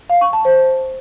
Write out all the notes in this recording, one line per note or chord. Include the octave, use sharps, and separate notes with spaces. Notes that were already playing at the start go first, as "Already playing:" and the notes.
F5
C#6
A5
C5